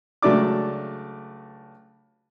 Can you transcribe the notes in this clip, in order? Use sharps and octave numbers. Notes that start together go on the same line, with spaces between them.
C#2 F#3 A3 D4 D5 D6